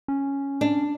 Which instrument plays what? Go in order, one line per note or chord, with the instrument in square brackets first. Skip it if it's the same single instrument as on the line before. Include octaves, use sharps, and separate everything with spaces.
[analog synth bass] C#4
[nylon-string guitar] D4